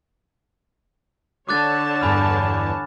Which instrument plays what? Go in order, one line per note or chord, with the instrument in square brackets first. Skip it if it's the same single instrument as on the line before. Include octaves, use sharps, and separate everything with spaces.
[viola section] D3 C#5 A5 [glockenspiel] D6 F#6 A6
[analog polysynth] E2 G2 [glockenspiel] G#5 B5 F6